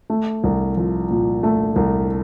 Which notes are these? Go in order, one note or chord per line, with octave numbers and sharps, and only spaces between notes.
A3
C2
F3
A#2
A3
C2